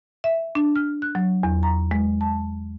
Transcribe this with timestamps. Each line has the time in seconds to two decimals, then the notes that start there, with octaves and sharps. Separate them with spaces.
0.24 E5
0.55 D4
0.76 F6
1.02 F#6
1.15 F#3
1.43 E2
1.63 A#5
1.91 G#3
2.21 A5